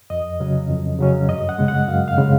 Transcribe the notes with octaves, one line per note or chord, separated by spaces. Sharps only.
F2 D#5
C#3 F#3 C#4
F2
C#3 F#3 C#4
F#2 D#5
F#5
C#3 G#3
F#5
F#2 F5
F5
C#3 G#3